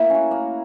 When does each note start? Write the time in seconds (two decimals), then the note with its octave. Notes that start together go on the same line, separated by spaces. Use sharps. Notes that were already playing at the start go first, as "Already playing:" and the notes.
Already playing: A#3 E4 A#4 E5
0.10 C#4 F#4
0.31 A#3